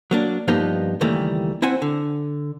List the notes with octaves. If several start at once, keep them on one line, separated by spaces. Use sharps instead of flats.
F#3 A#3 D4
G2 F3 A#3 B3 D#4 G4
C#2 D#3 E3 G3 A3 A#3
C4 E4 C5 F#5 G#5
D3